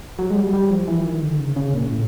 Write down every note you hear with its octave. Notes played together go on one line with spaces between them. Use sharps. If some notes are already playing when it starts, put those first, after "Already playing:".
F#3
G#3
G3
G3
F3
E3
D#3
D3
C#3
C#3
A#2
A2